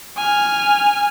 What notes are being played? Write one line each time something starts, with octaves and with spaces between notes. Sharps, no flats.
G#5 F6